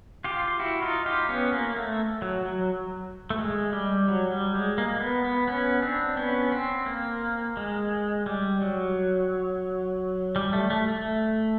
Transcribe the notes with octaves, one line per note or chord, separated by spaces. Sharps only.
F4 G4
E4 F#4
D#4 F4
F4 G4
B3 C#4
A#3
A3
F#3
F#3
A3
G#3
G3
F#3
G3
G#3
A#3
B3
B3
B3 C#4
C4 D4
B3 C#4
C4
A#3
G#3
G3
F#3
G3
A3
A3
A3